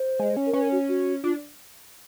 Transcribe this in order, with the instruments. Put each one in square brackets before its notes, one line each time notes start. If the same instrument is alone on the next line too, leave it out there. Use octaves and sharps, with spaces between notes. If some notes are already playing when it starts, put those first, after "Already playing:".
Already playing: [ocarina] C5
[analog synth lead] G#3
C#4
[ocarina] A#4
[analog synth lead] C#4 [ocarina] B4
[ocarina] A#4
F#4
F#4
[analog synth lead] D4 [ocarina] F4